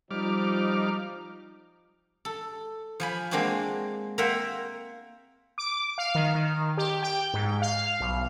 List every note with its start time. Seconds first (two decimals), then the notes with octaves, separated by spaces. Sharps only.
0.11 F3 G3 D#4 D6 F6
2.25 A4
3.00 F3 G#5 B5
3.31 G#3 A#3 C4 D4 F#4 G#5
4.18 A#3 A#4 E5 F#5 G5 C6
5.58 D6
5.98 F5
6.15 D#3
6.35 D#3
6.78 G4
7.02 G5
7.34 G#2
7.62 F5
8.00 B1